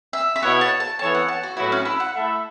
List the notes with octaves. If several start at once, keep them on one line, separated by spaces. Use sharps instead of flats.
E5
E5
B2 B3 E4 C#5 F#5
A5
A5
E3 B3 A4 C#5 A5
F#5
A5
F#4
A2 F#3 B3 E4 F#4
C#4
E4
F#5
A3 E4 A4 E5